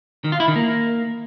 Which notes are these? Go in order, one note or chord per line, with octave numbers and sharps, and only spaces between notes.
D#3
F4
E4
D#3
A#3